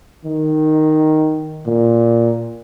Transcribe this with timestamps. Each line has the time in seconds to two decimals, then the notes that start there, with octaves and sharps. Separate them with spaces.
0.25 D#3
1.66 A#2